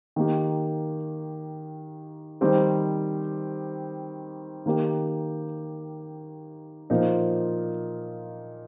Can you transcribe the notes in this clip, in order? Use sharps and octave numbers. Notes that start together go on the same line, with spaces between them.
D#3 A#3 G4
D#3 G3 C4 G4
D#3 A#3 G4
A#2 F3 A#3 D#4